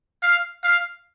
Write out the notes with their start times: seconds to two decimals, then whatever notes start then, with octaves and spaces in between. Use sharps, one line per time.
0.22 F5
0.64 F5